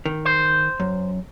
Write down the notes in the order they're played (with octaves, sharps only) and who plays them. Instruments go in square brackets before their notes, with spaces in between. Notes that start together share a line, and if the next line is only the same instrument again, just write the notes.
[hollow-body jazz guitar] D#3
[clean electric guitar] C5
[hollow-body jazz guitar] F#2